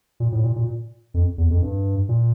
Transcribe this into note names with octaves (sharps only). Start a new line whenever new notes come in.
A#2
A2
A#2
A#2
F2
E2
F2
G2
A#2